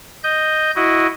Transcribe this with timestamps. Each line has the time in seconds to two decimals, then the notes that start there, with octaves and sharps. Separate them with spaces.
0.23 D#5 G6
0.76 E4 F#4 D#5